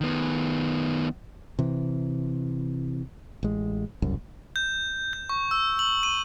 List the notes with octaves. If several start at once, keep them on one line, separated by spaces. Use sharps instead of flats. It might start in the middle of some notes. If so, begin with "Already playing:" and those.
D#3 B3
C3 E3
A1 G#3
E1 C2 F#2
G6
G6
C#6
E6
F#7
D#7